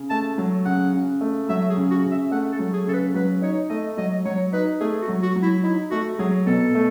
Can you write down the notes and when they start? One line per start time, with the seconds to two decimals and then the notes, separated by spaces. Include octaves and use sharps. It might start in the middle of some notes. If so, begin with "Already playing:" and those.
Already playing: C#3
0.10 A3 A5
0.38 F#3
0.65 C#3 F#5
0.94 C#3
1.21 A3
1.49 F#3 E5
1.70 G#4
1.77 C#3
1.91 F#4
2.04 C#3
2.11 E5
2.31 A3 F#5
2.52 A4
2.59 F#3
2.73 G#4
2.87 C#3 A4
2.94 B4
3.14 F#3 B4
3.42 D#4 C#5
3.69 A3 D#5
3.97 F#3 D#5
4.25 F#3 C#5
4.53 D#4 B4
4.80 A3 G#4
5.01 F#4
5.08 F#3
5.22 F#4
5.36 F#3
5.42 E4
5.64 D#4 E4
5.91 A3 F#4
6.19 F#3 G#4
6.46 B2 A4
6.75 A3